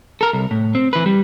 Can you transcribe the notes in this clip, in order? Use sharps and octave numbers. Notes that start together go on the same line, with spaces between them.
A4 A#4
C2
A2
C4
E3 B4
G3